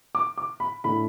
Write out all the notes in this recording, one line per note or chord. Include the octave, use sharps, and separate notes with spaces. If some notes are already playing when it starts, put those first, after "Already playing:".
D6
D6
B5
A2 A3 D4 B5